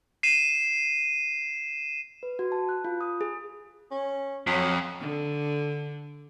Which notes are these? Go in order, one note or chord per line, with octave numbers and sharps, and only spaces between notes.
C7 D#7 E7
B4
F#4
A5
F#6
F4
D#6
G#4
C#4
F2 F#3
D3